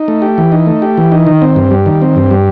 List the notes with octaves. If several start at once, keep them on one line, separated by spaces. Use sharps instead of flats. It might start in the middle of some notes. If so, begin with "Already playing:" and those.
Already playing: D#4
A3
G4
E3
D#4
A3
G4
E3
D#4
D#3
C4
G2
G3
D#3
C4
G2
G3